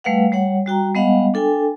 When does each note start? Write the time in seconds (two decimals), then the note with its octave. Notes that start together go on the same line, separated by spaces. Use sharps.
0.04 G3 A3 B4 F5 F#5
0.32 G3 C#5 F#5
0.66 G3 F#4 G5 A#5
0.95 G3 G#3 B3 D#5 F5 F#5
1.34 D4 A4 G5 G#5